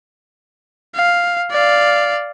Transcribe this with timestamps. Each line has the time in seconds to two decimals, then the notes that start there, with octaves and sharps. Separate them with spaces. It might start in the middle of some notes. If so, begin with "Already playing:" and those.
0.95 F5
1.51 D5 F5